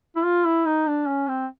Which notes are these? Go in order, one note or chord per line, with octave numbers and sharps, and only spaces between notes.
E4
F4
E4
D#4
D4
C#4
C4